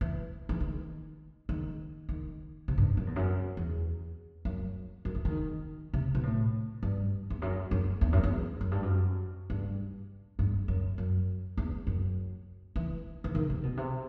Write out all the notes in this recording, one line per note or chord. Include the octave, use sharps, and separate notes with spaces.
E3
E3
D#3
D#3
D#3
C3
G2
F#2
E2
F#2
E2
F#2
F#2
E3
D#3
C3
B2
A2
G2
E2
F#2
F#2
E2
F#2
E2
F#2
G2
F#2
G2
G2
F#2
F#2
E2
F#2
E3
E3
D#3
C3
B2
C3